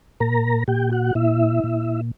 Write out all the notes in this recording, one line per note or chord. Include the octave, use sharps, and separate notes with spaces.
A#2 A#4 A#5
A#2 G4 G5
F#4 F#5
A#2 E4 E5
A#2